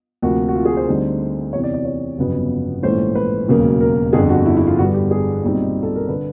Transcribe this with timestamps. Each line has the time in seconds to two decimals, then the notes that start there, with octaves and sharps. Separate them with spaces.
0.22 D2 C3 F3 A#3 F#4
0.48 F#4
0.55 F4
0.65 G#4
0.77 C5
0.88 D2 D3 G3 C4 D#4
1.53 E2 C3 E3 C#5
1.64 D5
1.74 D5
1.85 C#5
2.18 G1 F2 C#3 F#3 B3
2.83 A#1 G#2 E3 A3 C#4 C5
3.15 B4
3.48 E1 D#2 C#3 F#3 A#3
3.81 A#4
4.13 G1 F2 D3 G#4
4.29 F#4
4.46 E4
4.57 E4
4.67 F4
4.78 G2 D3 G3 B3 F#4
4.94 G4
5.11 G#4
5.43 B1 A#2 G3 C4 D#4
5.83 A4
5.96 A#4
6.08 D3 B4